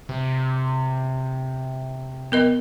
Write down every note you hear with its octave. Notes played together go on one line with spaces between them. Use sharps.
C3
B3 A#4 D#5